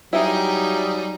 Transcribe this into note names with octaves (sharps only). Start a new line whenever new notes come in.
F#3 G3 D#4 E4 G#4